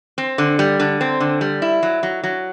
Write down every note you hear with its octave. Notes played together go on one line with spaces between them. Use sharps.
C4
D3
G3
D3
C4
D3
G3
E4
F#3
F#3
F#3